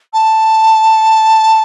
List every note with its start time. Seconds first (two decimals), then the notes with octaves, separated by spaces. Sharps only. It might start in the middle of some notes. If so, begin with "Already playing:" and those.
0.13 A5